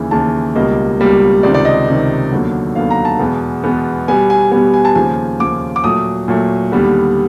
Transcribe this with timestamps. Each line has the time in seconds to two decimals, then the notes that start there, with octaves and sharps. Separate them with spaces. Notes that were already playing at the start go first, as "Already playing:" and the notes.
Already playing: D#2 C#3 E3
0.11 D#2 C#3 E3 A5
0.55 C#2 B2 G3 A#3 D#5
1.00 C#2 B2 G3 A#3
1.43 C#2 C3 D#3 D5
1.54 D5
1.65 D#5
1.88 C#2 C3 D#3
2.32 D#2 D3 F#3 B3
2.75 D#2 D3 F#3 B3 F5
2.90 A#5
3.05 A5
3.19 E2 B2 G#3 B3
3.64 E2 B2 G#3 B3
4.08 B2 G3 B3 G#5
4.30 G#5
4.52 B2 G3 B3 G#5
4.74 G#5
4.85 A5
4.95 D#2 C#3 F3 G#5
5.40 D#2 C#3 F3 D6
5.76 D6
5.84 A#2 F#3 A3 D#6
6.28 A#2 F#3 A3
6.72 D#2 D3 G3 B3